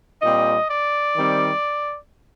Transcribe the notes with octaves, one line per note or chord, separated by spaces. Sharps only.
A#2 G3 C4 D#5
D5
D#3 G3 C4